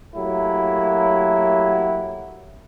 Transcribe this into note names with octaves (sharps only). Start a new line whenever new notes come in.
F#3 A3 A#3 E4 G4